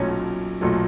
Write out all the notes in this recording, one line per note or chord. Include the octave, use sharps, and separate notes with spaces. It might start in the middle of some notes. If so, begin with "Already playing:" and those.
Already playing: B1 A#2 F#3 A3 C#4 C#5
B1 A#2 F#3 A3